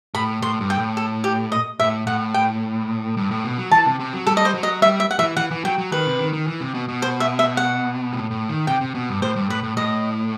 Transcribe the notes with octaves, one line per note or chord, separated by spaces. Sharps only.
A2 B5
A2 C6
G2
G5
A2
A4
G4
D#5
A2 E5
A2 F#5
G5
G2
A2
B2
F#3
E3 A5
C3
C3
F#3
G3 A4
D#5
C5
F#3
D#5
G3 E5
E5
F#5
E3 E5
E3 F#5
E3
F#3 G5
F#3
D#3 B4
C3
D#3
D#3
E3
C3
B2
B2
C5
E5
E5
F#5
A2
A2
D#3
C3 G5
C3
B2
G2
A2 C5
G2
A2 B4
A2
A2 D#5